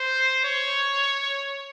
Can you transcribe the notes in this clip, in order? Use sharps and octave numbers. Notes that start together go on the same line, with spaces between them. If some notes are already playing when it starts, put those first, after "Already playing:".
Already playing: C5
C#5